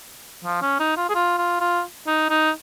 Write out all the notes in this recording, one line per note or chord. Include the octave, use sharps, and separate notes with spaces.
F3
C#4
D#4
F4
G#4
F4
F4
F4
D#4
D#4